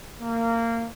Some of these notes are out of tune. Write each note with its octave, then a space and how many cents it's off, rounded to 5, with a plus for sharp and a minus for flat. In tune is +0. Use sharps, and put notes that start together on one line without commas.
A#3 -20